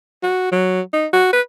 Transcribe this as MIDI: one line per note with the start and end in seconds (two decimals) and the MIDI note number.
0.23 0.51 66
0.52 0.81 54
0.93 1.07 63
1.13 1.29 66
1.33 1.41 71